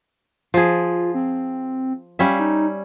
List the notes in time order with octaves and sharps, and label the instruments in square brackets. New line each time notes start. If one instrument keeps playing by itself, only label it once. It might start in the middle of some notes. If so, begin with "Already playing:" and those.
[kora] F3 G#4 [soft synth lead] F4
[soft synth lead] C4
[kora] G3 C#4 E5 [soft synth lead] F5
[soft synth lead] D#4